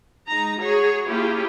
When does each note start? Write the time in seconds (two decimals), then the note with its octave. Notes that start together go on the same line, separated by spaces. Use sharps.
0.27 G#3 D#4 A#5
0.60 F#4 G#4 C#5
1.08 A#3 C#4 E4 F4 G4 G#4